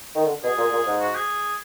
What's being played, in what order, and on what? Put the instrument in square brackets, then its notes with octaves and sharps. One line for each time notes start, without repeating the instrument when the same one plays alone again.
[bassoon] D#3
D3
[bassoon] B2 [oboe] G#4
[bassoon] A#2
A#2
G#2
[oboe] F#4
G#4